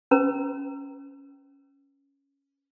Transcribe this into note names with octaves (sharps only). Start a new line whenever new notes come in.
C#4 B4 A#5